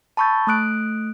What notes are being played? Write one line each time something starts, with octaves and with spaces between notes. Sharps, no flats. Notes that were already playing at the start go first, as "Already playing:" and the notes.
A5 B5 C#6 E6 G6 A6
A3 D#6 F#6 D7